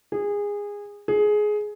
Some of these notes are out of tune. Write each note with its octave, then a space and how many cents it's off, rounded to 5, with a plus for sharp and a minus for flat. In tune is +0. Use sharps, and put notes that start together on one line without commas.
G#4 -20
G#4 +15